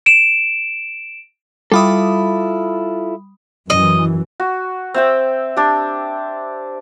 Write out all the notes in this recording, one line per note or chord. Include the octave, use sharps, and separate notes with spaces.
D7 E7
G3 E4 F4 A4 B5 D#6
F#2 E3 D#5
F#4
C4 E5 G5
D4 G4